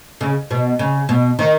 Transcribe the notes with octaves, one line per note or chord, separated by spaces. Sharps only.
C#3
B2
C#3
B2
D#3